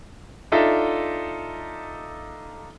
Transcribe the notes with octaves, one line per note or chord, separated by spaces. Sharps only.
D4 D#4 F4 A4 E5